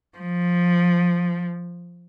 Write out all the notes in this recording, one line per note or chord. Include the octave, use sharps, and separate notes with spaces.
F3